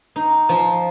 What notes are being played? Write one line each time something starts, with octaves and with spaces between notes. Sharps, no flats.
D#4
F3